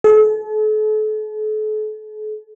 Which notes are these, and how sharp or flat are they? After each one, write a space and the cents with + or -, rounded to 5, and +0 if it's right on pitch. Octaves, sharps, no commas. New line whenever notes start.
A4 -40